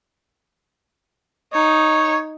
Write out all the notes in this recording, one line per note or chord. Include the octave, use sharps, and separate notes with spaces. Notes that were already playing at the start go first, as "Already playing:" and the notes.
D#4 C#5